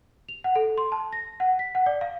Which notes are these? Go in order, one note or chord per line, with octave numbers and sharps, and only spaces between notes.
F7
F#5
A4
C6
A5
A#6
F#5
B6
F#5
D5
F5